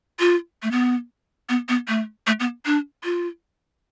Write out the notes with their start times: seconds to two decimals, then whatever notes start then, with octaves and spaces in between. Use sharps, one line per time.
0.20 F4
0.63 A3
0.71 B3
1.49 B3
1.69 B3
1.88 A3
2.27 A3
2.40 B3
2.66 D4
3.04 F4